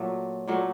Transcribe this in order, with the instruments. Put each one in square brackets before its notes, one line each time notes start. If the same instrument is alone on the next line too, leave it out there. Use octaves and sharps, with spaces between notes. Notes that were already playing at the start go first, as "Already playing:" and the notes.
Already playing: [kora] A#2 F#3 A3
A#2 F#3 A3